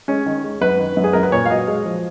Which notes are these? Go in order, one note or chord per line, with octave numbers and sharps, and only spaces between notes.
G#3 C#4
D#3
G#3
F#2 B4
D#3
F#2
G#4
F#2 A#4
B4
A#2 C#5
F5
F#3 D#5
G#3
F3